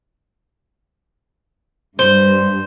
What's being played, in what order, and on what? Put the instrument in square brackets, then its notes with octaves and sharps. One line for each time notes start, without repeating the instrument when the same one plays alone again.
[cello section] G2 [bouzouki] C5